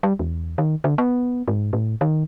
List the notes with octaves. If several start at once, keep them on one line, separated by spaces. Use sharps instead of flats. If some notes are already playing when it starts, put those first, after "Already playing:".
G3
E2
D#3
D3
B3
G#2
A2
D#3